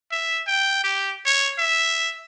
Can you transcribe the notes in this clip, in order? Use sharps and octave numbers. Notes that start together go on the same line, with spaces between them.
E5
G5
G4
C#5
E5